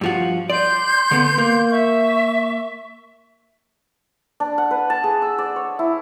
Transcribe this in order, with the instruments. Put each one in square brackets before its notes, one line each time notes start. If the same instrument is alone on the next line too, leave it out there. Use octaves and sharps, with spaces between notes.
[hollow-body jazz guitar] G2 F3 F#4
[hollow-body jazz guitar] D5 [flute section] C6 G6
[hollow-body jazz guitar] D3 B3
A#3
[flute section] E5 C#6
[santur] D4
F#5
B4
A5
G#4
E6
D5
C#5
E4